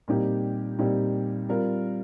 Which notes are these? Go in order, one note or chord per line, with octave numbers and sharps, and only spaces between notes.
A#2 G3 C4 D#4 G4
A#2 G3 C4 D#4 G4
G3 C4 F4 A#4